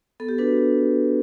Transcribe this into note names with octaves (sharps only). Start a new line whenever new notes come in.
B3 A4
G4
D4 F#4 B4